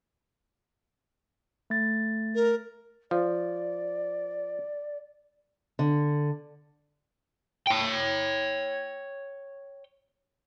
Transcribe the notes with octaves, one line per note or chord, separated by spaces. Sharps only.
A3 A6
A#4
F3 D5
D3
C#5 G5